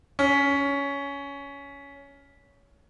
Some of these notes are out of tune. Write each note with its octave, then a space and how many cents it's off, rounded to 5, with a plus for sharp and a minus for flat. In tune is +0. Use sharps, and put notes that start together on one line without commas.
C#4 +15